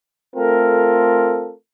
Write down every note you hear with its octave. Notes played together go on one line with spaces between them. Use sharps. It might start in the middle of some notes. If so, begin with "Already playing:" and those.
A3 C4 F4 A4 A#4